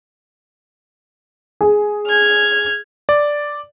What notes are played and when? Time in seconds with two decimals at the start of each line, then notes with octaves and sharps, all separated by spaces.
1.61 G#4
2.07 F6 G#6
3.09 D5